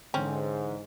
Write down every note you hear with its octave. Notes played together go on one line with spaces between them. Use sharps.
G#2 D3 E3 C4 C#4